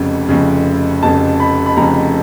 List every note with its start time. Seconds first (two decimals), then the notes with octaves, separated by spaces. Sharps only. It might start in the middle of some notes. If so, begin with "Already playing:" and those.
Already playing: F1 F2 C#3
0.29 F1 F2 C#3
1.03 F1 F2 C#3 A5
1.40 B5
1.66 B5
1.77 F1 F2 C#3 A#5